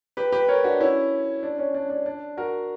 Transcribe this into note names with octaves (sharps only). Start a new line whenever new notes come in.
G4 B4
G4 B4
A#4 C#5
D4 F#4
C#4 E4
D4
C#4
D4
D4
D4
F#4 A#4